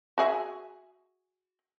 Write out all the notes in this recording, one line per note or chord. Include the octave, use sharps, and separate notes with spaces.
F#4 G#4 E5